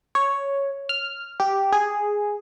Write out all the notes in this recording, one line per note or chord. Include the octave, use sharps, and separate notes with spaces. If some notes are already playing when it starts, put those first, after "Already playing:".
C#5
F6
G4
G#4